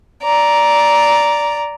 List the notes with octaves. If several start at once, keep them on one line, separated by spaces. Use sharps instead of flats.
D5 A#5